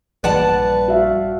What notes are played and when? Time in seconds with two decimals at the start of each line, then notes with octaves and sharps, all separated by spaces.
0.24 A#1 G2 B4 D5 F#5 A5
0.88 F#4 E5 F5